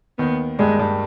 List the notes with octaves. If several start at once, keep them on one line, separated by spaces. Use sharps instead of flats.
D#2 D#3 B3
G2 G3 G#3
G2 G3